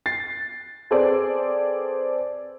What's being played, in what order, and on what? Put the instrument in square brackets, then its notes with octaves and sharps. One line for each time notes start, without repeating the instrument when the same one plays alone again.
[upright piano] A6 C7
C4 G#4 A4 B4 C5 D5